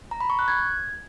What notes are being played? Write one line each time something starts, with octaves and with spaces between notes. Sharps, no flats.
A#5
B5
C#6
F#6
G#6